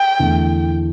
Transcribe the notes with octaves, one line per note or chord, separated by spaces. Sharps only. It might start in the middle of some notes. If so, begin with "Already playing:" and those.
Already playing: G5
E2 D3 A3